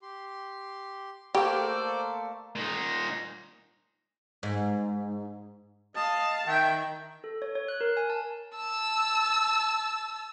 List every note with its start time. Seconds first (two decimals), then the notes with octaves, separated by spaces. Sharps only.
0.02 G4 C6
1.35 A3 A#3 G4 A4 C5 D5
2.55 A#2 D#4
4.43 G#2
5.96 D#5 F5 A5
6.47 D#3 E5 G5
7.24 A4
7.42 C#5
7.55 C#5
7.68 F#6
7.81 A#4
7.97 G#5
8.10 A5
8.55 A5 E6